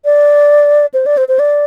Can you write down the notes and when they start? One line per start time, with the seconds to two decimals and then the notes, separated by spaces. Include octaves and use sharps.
0.05 D5
0.94 C5
1.06 D5
1.17 C5
1.28 C5
1.39 D5